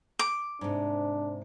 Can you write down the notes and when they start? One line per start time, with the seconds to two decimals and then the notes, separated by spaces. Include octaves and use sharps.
0.19 D6
0.61 G#2 C3 D4